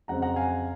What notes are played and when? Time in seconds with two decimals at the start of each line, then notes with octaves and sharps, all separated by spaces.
0.08 F2 C#3 F#3 C4 F#5 A#5
0.22 F#5 A#5
0.36 F5 G#5